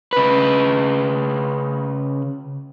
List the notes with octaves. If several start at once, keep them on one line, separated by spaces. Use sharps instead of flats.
C#3 B4